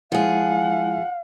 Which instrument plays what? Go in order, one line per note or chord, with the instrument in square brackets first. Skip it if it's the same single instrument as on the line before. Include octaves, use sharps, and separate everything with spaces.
[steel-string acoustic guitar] F3 G#4 [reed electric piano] G#3 E4 [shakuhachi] F5 [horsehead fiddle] F#5